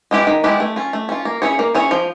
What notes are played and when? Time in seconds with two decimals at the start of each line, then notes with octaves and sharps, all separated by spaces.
0.11 G#3 B3 E4 G4
0.27 D#3
0.44 G#3 B3 E4 G4
0.60 A3
0.76 C#4 F4
0.93 A3
1.09 C#4 F4
1.25 A#3
1.42 C#4 E4 G#4 C#5
1.59 A#3
1.74 C#4 E4 G#4 C#5
1.91 F3